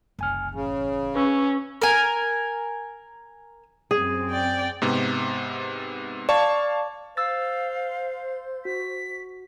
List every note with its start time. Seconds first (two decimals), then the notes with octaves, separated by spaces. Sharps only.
0.19 F#1 C2 G#5 F6
0.54 A1 C#3
1.15 C#4 B4 C#6 E6
1.82 A#4 G#5
3.91 F#2 C4 G#4
4.30 D5 G5
4.82 G#2 C3 B3
6.29 D5 F5 A5 C#6
7.17 C5 F5 E6 A6
8.65 F#4 B6